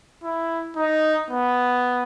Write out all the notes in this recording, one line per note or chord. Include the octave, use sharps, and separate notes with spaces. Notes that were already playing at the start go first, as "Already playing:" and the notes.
E4
D#4
B3